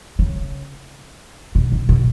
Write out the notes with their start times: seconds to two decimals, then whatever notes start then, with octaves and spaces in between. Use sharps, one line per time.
0.19 C#3
1.55 B2
1.72 B2
1.89 B2